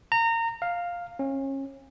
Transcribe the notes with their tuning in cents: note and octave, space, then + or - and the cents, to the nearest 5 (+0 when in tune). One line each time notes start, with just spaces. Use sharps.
A#5 -25
F5 +5
C#4 -30